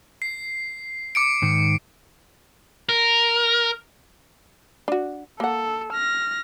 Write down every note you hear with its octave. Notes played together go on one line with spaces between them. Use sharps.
C7
D6 C#7 D7
G#2 D#3
A#4
D4 F#4
A#3 A4 F#5
F6 A#6